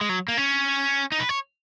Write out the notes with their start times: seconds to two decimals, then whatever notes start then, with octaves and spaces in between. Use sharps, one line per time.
0.01 G#3
0.09 F#3
0.28 A#3
0.38 C#4
1.12 D#4
1.20 B4
1.29 C#5